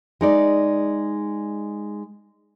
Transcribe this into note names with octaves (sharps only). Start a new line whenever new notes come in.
G#3 D#4 D5